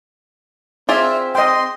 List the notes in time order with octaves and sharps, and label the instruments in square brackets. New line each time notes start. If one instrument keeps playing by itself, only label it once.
[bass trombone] C4 [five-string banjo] F4 G#4 D5 [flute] E5
[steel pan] D#5 G5 [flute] C6